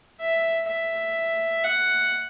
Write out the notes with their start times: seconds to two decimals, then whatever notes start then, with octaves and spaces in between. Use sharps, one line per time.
0.21 E5
0.69 E5
1.64 F#5